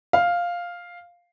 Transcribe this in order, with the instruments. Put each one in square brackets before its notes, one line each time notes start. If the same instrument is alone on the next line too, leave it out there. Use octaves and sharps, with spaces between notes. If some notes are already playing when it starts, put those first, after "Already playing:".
[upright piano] F5